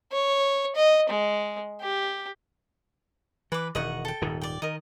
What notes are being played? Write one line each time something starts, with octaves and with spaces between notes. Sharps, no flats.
C#5
D#5
G#3
G4
E3 B4 D6
E1 D#3 D#5 F#5 C#6
A4 G5
D#1 G#2 D#3
D5 G5
D#3 A#4 D#5